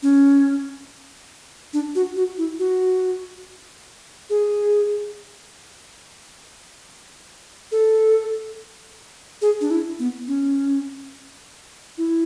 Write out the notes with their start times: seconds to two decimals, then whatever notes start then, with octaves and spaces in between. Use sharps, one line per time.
0.03 C#4
1.73 D4
1.95 F#4
2.16 F#4
2.38 E4
2.59 F#4
4.30 G#4
7.72 A4
9.42 G#4
9.61 D4
9.71 E4
9.99 B3
10.28 C#4
11.98 E4